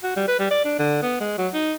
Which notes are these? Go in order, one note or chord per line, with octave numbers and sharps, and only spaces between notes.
F#4
G3
B4
G3
D5
D4
D3
B3
G#3
F#3
D#4